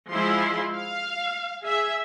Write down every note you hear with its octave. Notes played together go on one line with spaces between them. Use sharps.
F3 G#3 E4 C6
F5
G#4 E5